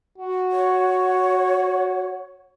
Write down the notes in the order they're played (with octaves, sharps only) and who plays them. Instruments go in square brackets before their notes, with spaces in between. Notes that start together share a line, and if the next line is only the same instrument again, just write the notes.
[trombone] F#4
[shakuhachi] C#5